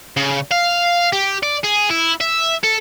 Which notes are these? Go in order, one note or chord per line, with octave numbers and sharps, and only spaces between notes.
C#3
F5
G4
D5
G#4
E4
E5
A4